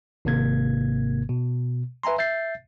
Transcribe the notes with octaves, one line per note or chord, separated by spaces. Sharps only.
G#1 G#2 C3 A#3 G#6
B2
B4 E5 G#5 A#5 C6
E5 G6 A6 C7